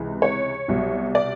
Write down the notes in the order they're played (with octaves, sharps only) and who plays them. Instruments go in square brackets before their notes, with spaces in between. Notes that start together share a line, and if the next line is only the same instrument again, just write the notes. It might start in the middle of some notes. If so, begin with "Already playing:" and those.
Already playing: [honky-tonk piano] C#2 C3 E3
C#5
C2 B2 F#3
D5